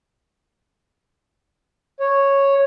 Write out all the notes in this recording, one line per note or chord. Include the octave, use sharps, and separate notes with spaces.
C#5